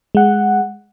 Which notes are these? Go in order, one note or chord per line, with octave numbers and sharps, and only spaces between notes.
G#3 F#5